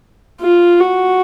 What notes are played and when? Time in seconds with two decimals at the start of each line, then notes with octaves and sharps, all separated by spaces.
0.41 F4
0.80 F#4